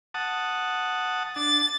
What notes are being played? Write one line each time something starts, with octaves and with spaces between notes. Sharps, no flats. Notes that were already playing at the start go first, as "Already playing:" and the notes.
F#5 A5 D#6
D4 A6